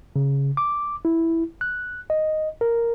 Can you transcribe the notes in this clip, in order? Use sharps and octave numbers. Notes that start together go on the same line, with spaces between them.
C#3
D6
E4
F#6
D#5
A#4